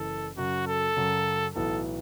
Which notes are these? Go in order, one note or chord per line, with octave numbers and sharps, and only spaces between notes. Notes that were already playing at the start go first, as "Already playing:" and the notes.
Already playing: F#1 E3 A4
F#2 C#3 F#3 F#4
A4
F#2 C#3 F#3
B1 A2 E3 B3 A4